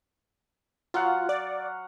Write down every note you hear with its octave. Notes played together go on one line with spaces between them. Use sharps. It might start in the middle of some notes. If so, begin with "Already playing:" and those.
F#3 F4 F5 F#5
D5